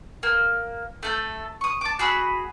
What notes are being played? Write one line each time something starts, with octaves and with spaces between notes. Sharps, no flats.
A#3
A3 A4 G6
C#6 D#6
A5 D6
F#4 G#4 B5 E6